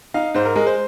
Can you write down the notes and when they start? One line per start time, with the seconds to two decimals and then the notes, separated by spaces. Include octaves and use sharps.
0.14 D#4 F5
0.34 G#2 C5
0.45 A#4
0.56 G#3 A#4
0.67 C5